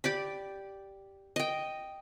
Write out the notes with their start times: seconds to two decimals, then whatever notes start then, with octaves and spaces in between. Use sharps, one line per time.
0.04 G4 D5 B5
1.36 D#5 G5